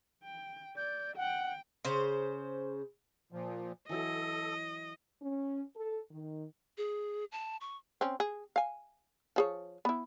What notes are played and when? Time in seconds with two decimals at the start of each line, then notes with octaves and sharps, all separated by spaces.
0.24 G5
0.77 D5 G6
1.17 F#5 G5
1.85 C#3 C5
3.32 A#2 F3
3.89 E3 F#3 E4 A4 D#5
5.22 C#4
5.75 A4
6.11 D#3
6.78 G#4
7.32 A5
7.61 C#6
8.01 C4 C#4
8.20 G#4
8.56 F5 G#5
9.36 F3 G#4 C#5
9.85 B3 E4